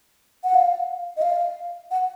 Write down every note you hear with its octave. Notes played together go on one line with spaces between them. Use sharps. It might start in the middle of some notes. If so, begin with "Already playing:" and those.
F#5
F5
D#5
F5
F#5